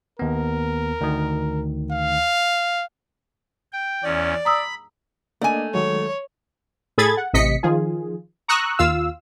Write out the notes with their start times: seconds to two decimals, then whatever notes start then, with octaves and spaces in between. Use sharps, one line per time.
0.19 D#2 B3 A#4
1.01 D2 D#3
1.92 F5
3.72 G5
4.04 E2 C#4 D5
4.45 A#5 B5 D#6 E6
5.41 A3 A#3 D4 D#5 G#5
5.74 D#3 F#3 G#3 C#5
6.98 A2 G#4 A4 B5 G#6 A6
7.17 F#5
7.33 A1 C3 D#5 B6 C#7
7.63 D#3 F3 F4 G#4
8.48 A#5 C#6 D#6 E6 F#6
8.79 D#2 F4 F5 E6